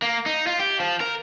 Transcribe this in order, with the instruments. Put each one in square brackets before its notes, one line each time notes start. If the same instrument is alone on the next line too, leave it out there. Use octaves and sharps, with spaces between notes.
[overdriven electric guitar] A#3
D#4
F4
G4
F3
A#4